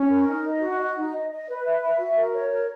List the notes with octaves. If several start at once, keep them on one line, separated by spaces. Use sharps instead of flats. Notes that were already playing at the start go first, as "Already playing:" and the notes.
Already playing: C#4
A#4
D#4
D#5
F#4
D#5
D#4
D#5
D#5
B4
E5
E5
F#4
A#4
C#5
A#4